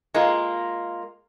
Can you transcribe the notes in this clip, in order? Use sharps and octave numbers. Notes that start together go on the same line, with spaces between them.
G#3 A#3 F4